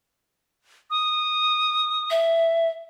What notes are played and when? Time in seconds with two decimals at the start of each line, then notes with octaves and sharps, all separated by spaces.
0.90 D#6
2.10 E5